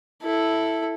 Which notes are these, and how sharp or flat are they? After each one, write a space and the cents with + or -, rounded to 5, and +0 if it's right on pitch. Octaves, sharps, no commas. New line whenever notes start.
E4 +0 A4 +0